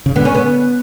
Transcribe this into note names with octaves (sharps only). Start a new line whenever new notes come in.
C#3
D3 B3
C#4
B3